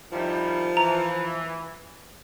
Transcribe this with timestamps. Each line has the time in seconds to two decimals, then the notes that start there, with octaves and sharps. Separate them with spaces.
0.12 D#3 F3 G3 E4
0.77 E3 A#5